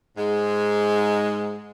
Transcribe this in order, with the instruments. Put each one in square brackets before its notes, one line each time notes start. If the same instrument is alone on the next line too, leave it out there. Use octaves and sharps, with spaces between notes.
[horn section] G#2 G#3